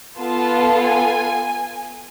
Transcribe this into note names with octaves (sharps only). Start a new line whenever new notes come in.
B3 F4 A4 A5
G#5